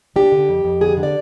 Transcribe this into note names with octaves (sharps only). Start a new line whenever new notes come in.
D4 G4
D3
F2
F2
D3 G#4
D3
D5